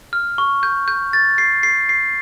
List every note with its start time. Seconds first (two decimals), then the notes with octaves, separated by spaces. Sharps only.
0.13 F6
0.38 C#6
0.63 G6
0.88 G6
1.13 A6
1.38 C7
1.63 C7
1.89 C7